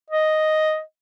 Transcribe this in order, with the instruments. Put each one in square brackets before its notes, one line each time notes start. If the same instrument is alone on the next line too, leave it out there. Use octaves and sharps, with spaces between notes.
[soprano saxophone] D#5